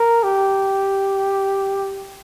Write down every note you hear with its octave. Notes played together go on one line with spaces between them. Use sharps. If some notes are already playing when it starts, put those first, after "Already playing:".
Already playing: A#4
G4